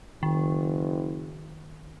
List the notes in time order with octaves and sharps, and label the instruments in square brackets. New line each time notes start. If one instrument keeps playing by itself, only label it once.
[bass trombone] F#1 [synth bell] D#3